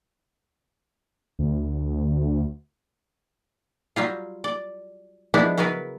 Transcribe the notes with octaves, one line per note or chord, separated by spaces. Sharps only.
D2
F#3 G3 F4
D5
F3 G3 G#3 B3 D4 E4
C#3 F#3 B3 A#4 B4